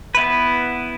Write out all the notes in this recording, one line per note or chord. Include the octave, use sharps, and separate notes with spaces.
B3 E4 B4